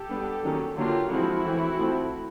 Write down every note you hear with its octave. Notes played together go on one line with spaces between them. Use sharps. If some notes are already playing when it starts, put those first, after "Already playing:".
Already playing: G4 A4
G3 B3 D4
D#3 F#3 A#3 C#4
D3 F#3 A#3 D4 F4 G4
F3 G#3 C4 E4 F#4
E3 A3 C4
F3 A3 C4